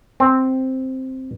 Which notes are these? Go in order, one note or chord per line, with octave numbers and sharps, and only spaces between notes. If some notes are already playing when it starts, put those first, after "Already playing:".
C4